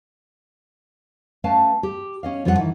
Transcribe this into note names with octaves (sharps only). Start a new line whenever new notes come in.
A3 C#4 B4 F5 G5 A5
G4
C#4 D#5 F5
F2 F3 G3 F4 A4 F#5
D#3 E3